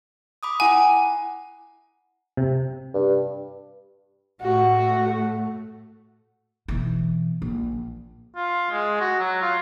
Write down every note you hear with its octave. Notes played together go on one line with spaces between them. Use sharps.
B5 D6 D#6
E4 F#5 G#5
C3
G2
A2 A3 F#4
B2 E3
A#1
F4
G#3
F#4
F#3
F4